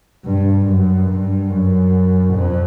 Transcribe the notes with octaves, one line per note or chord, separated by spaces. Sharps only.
G2
F#2
G2
F#2
F2